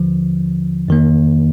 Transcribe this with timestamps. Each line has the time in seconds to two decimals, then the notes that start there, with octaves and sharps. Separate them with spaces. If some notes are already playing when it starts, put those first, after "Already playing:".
Already playing: D#2 D3 F3
0.88 F2 D#3 A#3